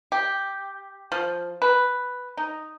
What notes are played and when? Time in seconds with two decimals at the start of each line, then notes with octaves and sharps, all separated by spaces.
0.12 G4
1.12 F3
1.62 B4
2.37 D#4